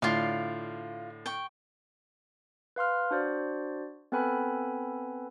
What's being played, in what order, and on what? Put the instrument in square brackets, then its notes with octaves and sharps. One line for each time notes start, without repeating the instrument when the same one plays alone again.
[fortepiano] A2 D3 [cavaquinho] F4 D5 F5
[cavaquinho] G5 C#6
[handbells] B4 F5 C6 F6
D4 F#4 C5 D5
B3 C4 A4 B4 G#5 B5